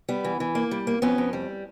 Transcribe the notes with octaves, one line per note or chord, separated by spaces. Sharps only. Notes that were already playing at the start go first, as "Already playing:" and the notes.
G3 B3
E3
E3
A#3
G3
A#3
F2 B3 C#4
F2
G3